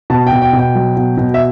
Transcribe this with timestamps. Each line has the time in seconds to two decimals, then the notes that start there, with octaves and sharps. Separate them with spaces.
0.10 B2 A5
0.27 G5
0.32 B2
0.42 G5
0.53 B2
0.59 G5
0.75 F#3
0.97 B2
1.17 B2
1.34 E5